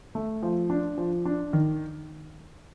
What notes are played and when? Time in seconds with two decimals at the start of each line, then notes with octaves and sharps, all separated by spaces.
0.15 A3
0.43 F3
0.70 D4
0.98 F3
1.25 D4
1.53 D#3